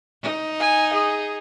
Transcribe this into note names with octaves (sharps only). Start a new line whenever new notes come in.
D#4
G#5
G#4